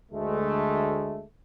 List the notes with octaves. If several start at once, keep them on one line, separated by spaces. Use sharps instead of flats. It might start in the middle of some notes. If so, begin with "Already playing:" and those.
D2 G#3 A3